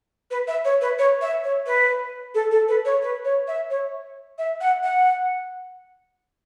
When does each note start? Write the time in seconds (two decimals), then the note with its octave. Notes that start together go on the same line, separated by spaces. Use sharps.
0.31 B4
0.48 E5
0.65 C#5
0.81 B4
0.99 C#5
1.22 E5
1.44 C#5
1.67 B4
2.35 A4
2.52 A4
2.68 B4
2.85 C#5
3.02 B4
3.25 C#5
3.48 E5
3.70 C#5
4.38 E5
4.61 F#5
4.84 F#5